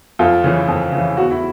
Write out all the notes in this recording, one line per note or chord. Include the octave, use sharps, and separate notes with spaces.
F2 F4
C#3 E3
F2
C#3 E3
E2 F#4
E4